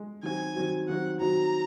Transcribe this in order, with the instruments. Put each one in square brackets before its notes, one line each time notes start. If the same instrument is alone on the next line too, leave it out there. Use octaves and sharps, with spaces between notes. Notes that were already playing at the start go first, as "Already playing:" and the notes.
Already playing: [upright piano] G#3
[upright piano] D#3 F#3 C4 F#4 [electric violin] G#5
[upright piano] D#3 F#3 C4 F#4
[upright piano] D#3 F#3 C4 F#4 [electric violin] F#5
[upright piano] D#3 F#3 C4 F#4 [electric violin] A#5